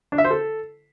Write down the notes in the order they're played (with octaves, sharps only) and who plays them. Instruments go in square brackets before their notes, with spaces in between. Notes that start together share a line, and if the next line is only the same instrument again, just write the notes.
[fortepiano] D4
E5
C5
A4